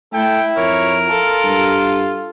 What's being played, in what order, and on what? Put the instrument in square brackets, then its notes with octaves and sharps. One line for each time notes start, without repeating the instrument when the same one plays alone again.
[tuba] A3 [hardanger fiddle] E4 [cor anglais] A4 [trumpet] G5
[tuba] F2 [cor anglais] A#4 [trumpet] C#5
[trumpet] F4 [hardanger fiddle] A4
[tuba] G2